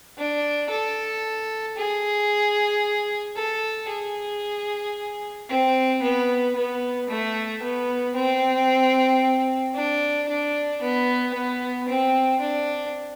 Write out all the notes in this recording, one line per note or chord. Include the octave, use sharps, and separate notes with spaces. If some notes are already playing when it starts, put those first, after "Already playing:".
D4
A4
G#4
A4
G#4
C4
B3
B3
A3
B3
C4
D4
D4
B3
B3
C4
D4